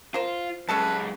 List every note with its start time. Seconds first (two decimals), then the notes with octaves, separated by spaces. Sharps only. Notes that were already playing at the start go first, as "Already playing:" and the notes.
0.14 F4 A#4 C5
0.69 F#2 G#3 C#4 A4 B4 A5